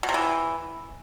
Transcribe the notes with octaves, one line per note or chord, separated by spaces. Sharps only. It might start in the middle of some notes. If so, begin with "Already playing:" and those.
B2
C3
E3